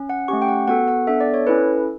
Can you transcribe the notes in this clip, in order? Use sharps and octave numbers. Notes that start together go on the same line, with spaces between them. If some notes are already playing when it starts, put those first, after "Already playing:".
Already playing: C#4
F#5
A3 C#4 G4 C#6
G5
F#5
B3 F#4 A4 F#5
F#5
B3 D4 A4 E5
D5
C#5
C#4 E4 A4 B4